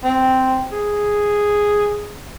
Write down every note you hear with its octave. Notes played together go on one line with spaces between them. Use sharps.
C4
G#4